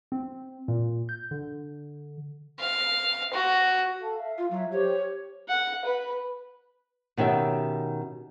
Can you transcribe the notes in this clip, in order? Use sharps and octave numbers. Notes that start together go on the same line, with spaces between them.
C4
A#2
G6
D3
F5
F#4
A4 F5 A5
E5 F5
F4
F#3 E5
G4 C5 C#5
F#5
B4
B2 D#3 C#4 G4 E5